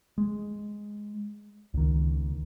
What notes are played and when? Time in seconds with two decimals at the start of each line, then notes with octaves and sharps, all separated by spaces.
0.18 G#3
1.74 C#2 D#3